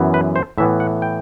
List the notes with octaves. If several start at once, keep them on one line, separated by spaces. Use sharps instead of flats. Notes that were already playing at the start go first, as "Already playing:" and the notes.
Already playing: F#2 E3 B3
B4
C5
A2 E3 B3 E5
F#5
G5